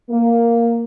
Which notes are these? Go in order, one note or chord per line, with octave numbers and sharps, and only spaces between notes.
A#3